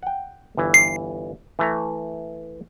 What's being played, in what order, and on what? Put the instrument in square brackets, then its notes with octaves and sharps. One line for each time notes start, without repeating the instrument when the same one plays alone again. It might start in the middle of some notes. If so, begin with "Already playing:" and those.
[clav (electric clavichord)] F#5 G5
G1 E3
[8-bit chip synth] C7
[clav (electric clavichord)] E3 A3 A#5